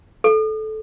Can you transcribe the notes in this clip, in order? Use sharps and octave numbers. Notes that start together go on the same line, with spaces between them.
A4